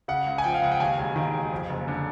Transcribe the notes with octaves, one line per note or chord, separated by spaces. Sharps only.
C#3 F#5
C#2
G#5
F3 G5
F5
C#2 F#5
G5
D#2 G#5
E1
D#3
E1
F2
F#1
D3